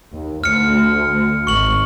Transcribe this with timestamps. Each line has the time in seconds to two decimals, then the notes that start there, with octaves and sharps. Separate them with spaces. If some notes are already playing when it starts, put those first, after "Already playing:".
0.13 D#2
0.44 D2 F6 C#7
1.47 G#1 C#6 F#7